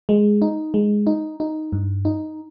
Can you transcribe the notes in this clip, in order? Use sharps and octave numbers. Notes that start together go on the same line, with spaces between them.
G#3
D#4
G#3
D#4
D#4
G2
D#4